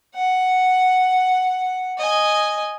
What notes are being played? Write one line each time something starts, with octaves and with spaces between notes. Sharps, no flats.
F#5
D#5 G#5